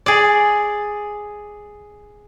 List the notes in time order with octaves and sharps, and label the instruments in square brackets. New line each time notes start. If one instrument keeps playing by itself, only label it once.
[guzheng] G#4 D5